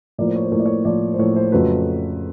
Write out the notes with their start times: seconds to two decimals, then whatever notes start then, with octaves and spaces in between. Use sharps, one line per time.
0.18 A2 F3 A#3 D5
0.27 C5
0.36 C#5
0.43 C5
0.52 A2 F3 A#3 C#5
0.60 D5
0.66 C#5
0.85 A2 F3 A#3 D5
1.14 C5
1.19 A2 F3 A#3 C#5
1.36 C5
1.52 F2 C#3 F#3 A3 B4